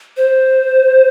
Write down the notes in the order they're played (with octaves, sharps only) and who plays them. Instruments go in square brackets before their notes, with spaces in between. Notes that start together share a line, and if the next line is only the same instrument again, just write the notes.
[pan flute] C5